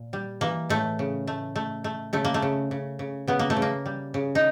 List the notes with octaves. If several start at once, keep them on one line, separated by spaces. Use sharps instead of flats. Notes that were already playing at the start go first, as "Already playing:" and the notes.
Already playing: A#2
G3
E3 A#3
A2 A3
C#3
A3
A3
A3
C#3 A3
A#3
A3
C#3
C#3
C#3
C#3 B3
A#3
A3
C#3
A#3
G3
C#3
D#4